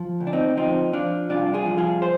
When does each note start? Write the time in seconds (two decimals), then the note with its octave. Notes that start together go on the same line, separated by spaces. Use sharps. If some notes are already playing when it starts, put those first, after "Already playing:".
Already playing: F3
0.20 D2
0.27 D4
0.33 C4 D#4
0.57 F3 C4 D#4
0.93 F3 D4 F4
1.29 C2 D4 F4
1.54 F4 G#4
1.66 F3
1.78 F4 G#4
2.02 C5